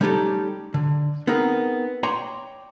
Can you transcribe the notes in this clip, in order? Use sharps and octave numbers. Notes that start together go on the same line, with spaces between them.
G3 A3 C#4 D#4 G4 A4
D3
B3 C4 D#4 G#4 A#4
C#5 D5 G5 A#5 C6